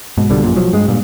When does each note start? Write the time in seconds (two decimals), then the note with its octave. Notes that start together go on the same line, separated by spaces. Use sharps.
0.18 G#2 B2
0.30 C2 B2 D3 G3
0.43 A#1 F#2 A#2
0.56 B1 F3 F#3
0.73 G2 G#3
0.88 G2 A#2